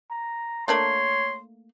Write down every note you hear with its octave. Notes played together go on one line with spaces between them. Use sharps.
A#5
A3 A#3 D4 C#5 C6